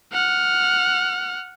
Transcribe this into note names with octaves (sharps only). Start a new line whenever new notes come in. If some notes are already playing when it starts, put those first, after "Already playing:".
F#5 F6